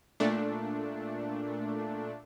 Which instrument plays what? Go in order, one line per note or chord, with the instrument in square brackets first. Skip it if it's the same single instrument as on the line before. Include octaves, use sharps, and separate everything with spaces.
[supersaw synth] A#2 A3 D4